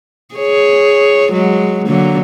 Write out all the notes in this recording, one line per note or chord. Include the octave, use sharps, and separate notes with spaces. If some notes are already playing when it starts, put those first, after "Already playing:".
G#4 C#5
F#3 G#3
D3 F#3 A#3